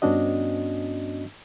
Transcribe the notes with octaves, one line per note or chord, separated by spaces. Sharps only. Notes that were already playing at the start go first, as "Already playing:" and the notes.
G2 B3 C#4 D4 F#4 D#5